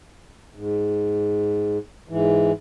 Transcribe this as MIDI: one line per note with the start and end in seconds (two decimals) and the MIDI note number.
0.55 1.78 44
2.09 2.52 44
2.09 2.52 52